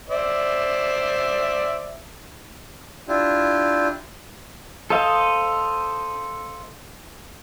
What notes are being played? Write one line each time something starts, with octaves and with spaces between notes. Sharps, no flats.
C5 D5 E5
D4 E4 F4 G4
A4 C5 D#5 F5